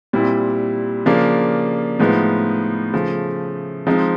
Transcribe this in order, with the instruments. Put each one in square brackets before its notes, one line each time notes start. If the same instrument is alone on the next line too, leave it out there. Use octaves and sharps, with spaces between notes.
[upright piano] A#2 G3 C4 E4
C#3 F3 A#3 D4
A2 F3 G#3 B3 D#4
C#3 F3 A3
F3 G#3 C4 D#4